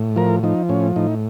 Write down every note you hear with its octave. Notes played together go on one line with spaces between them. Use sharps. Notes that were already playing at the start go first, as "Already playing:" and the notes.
Already playing: A2
F3 A#4
F3 D#4
A2 C#4
A2 D#4